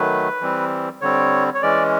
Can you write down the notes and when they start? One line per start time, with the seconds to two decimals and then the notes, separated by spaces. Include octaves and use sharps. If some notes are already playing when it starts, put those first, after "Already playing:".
Already playing: D#3 F#3 A3 B4
0.41 E3 G3 C4
1.01 D3 G3 C4 C#5
1.55 C#5
1.62 E3 G#3 C#4 D5